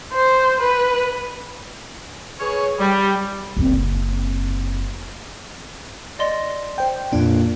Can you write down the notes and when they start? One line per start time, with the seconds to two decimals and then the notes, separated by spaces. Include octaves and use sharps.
0.14 C5
0.60 B4
2.40 G#4 B4 C#5
2.80 G3
3.57 F#1 C4
6.19 D5 D#5 C6
6.78 C5 G5
7.13 F2 A#2 D4